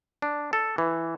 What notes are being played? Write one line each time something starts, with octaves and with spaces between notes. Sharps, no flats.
D4
A4
E3